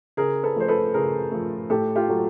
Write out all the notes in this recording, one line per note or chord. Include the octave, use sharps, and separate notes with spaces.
C#3 G#4 A#4
A4 B4
F3 A3 C5
A4 B4
C#3 G#4 A#4
F3 A3
A2 G4 A4
F4 G4
F#3 A3